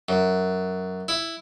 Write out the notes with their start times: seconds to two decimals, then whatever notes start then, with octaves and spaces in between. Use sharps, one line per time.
0.09 F#2
1.08 E4